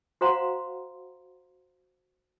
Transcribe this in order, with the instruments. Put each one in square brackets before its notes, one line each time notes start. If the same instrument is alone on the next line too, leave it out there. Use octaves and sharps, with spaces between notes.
[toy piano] F#4 C5 F5 F#5 A#5 C6